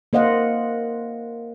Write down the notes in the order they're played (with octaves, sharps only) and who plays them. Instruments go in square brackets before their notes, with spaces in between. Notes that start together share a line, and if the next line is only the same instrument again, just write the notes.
[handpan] A#3 C5 D#5 F5 F#5